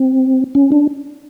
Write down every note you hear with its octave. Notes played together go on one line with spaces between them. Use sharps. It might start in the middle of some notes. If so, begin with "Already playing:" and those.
Already playing: C4
C#4
D4